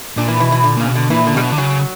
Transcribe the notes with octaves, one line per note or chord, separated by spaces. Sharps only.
A#2 D4
E3
B2 E3
E3
A#2 D3
A#2 C#3
B2
D3
A#2 E3
D3
B2 G3
F#3
D3
C#3 F#3